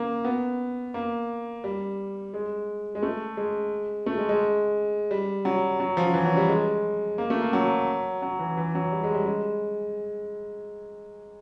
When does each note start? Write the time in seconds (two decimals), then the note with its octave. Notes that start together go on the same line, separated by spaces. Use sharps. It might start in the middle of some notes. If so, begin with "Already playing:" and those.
Already playing: A#3
0.25 B3
0.94 A#3
1.64 G3
2.34 G#3
2.95 G#3
3.03 A3
3.37 G#3
4.06 A3
4.18 G#3
4.29 G#3
5.11 G3
5.45 F#3
5.80 F#3
5.97 F3
6.14 E3
6.25 F#3
6.37 G3
6.49 G#3
7.18 A#3
7.30 A3
7.42 A#3
7.53 F#3
8.22 F#3
8.39 E3
8.57 E3
8.75 F#3
8.92 G3
9.03 G#3
9.15 G3
9.25 G#3